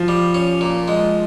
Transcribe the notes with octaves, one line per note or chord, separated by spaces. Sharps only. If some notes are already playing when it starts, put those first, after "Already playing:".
Already playing: F3
G3
C#4
A#2
G#3